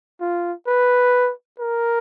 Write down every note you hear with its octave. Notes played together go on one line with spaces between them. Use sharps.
F4
B4
A#4